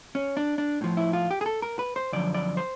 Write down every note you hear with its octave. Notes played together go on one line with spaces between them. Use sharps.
C#4
D4
D4
A2 F3
E4
F4
G4
G#4
A4
A#4
B4
C5
F#2 D3 F3 D5
D5
C5